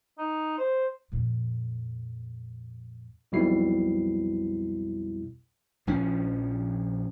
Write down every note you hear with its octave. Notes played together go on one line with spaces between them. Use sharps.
D#4
C5
F2 A#2
B1 F2 B2 G3 E4 C7
A#1 F3 C#4